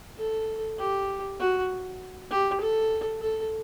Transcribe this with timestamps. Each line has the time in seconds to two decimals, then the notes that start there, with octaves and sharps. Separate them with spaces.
0.18 A4
0.79 G4
1.39 F#4
2.30 G4
2.61 A4
3.21 A4